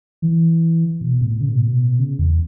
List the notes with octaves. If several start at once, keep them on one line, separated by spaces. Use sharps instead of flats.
E3
B2
A2
C#3
B2
A2
B2
C#3
E2